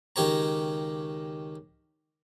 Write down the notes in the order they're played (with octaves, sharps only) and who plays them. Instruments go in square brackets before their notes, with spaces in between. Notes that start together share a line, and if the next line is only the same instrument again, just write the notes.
[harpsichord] C#2 D#3 G4 C#5 A#5